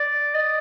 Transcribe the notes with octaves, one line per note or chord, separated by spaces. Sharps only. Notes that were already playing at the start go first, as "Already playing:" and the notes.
Already playing: D5
D#5